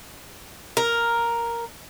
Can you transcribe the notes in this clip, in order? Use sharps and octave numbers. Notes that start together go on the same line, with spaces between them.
A#4